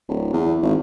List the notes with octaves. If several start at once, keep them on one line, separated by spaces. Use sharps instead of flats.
D1
E2
G#1